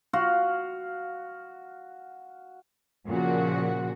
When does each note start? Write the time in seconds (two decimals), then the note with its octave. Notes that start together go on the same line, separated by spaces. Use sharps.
0.13 F#4 F5
3.07 A#2 C#3 F3 F#4